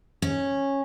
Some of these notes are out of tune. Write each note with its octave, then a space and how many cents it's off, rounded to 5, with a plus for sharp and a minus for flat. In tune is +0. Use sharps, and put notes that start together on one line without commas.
C#4 -10